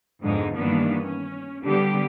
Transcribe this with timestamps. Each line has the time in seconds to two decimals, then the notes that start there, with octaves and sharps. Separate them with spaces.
0.22 F2 G#2 B2 D3 G#3 D#4
0.56 G2 D#3 E3 A#3 B3 D4
1.02 C#4
1.63 D3 G3 B3 G4